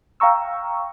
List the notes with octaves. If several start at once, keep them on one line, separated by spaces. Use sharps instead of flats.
F5 G5 A#5 C#6 E6